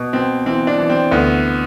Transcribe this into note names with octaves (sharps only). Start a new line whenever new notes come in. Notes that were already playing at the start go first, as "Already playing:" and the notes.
Already playing: B2
B2 C4
E3 C4
D4
E3
C4
D2 B3